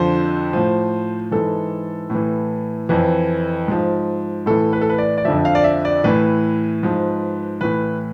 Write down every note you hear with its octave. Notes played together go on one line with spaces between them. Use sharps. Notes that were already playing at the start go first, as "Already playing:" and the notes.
Already playing: F2 D3 F3 C5
A2 F3
G#2 E3 A4
A2
E3
F2 E3
G#2 F3
A2 E3 A4
B4
A4
B4
D5
D5
F2 D3 F3 E5
F5
D5
E5
D5
A2 E3 B4
G#2 F3
A2 E3 B4